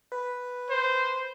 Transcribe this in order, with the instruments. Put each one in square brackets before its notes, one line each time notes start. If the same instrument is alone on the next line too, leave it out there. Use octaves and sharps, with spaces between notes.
[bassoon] B4
[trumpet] C5